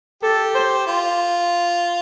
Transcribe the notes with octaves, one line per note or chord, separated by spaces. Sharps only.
G4 A4
C5
F4